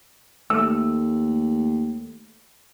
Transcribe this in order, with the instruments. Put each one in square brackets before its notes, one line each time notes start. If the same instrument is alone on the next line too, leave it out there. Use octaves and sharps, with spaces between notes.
[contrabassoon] D#2 [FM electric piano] A3 [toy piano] E6